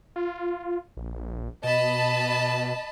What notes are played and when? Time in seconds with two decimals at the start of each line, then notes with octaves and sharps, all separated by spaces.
0.16 F4
0.97 A#1
1.64 B2 D#5 A5 B5